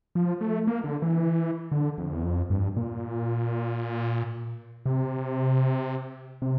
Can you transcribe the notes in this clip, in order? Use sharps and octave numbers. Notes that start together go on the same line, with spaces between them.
F3
A3
A#3
D3
E3
D3
F2
E2
F2
G2
A#2
C3
C3